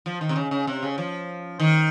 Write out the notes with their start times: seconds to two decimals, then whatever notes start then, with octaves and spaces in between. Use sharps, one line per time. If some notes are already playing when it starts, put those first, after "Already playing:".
0.06 F3
0.21 D#3
0.29 C3
0.36 C#3
0.51 C#3
0.67 C3
0.83 C#3
0.98 F3
1.60 D#3